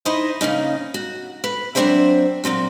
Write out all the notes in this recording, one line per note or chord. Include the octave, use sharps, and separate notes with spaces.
D#4 E4 B4 C5 D#5
C#3 A#3 C#4 D#4
F#4
B4
F#3 A3 C4 D4 C5 E5
A#2 F#3 C4 F#4